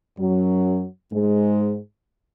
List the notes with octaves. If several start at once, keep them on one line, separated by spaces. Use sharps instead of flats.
F#2 F#3
G#2 G#3